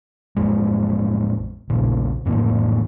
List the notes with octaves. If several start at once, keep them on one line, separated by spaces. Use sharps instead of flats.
A1 F2 G#3
A#1 A#2 C#3
F2 A2 E3 A#3